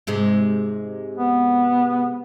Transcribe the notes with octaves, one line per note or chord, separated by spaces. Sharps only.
G#2 C3 G#3
B3